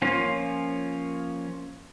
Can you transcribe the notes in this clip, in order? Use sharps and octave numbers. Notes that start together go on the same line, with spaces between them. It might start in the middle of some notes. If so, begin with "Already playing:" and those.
F3 A#3 C#4 F4